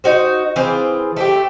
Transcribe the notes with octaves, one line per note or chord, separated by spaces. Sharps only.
D#4 F#4 C5
E3 C4 F4 G#4
A3 C4 G4